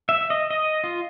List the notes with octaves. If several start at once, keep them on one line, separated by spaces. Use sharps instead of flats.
E5
D#5
D#5
F4